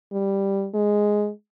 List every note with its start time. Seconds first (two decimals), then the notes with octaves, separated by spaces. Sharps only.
0.12 G3
0.74 G#3